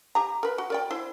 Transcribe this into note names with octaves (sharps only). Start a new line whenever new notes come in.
G4 A#5
A#4 B4
F#4
A#4 D5 G5
E4 C5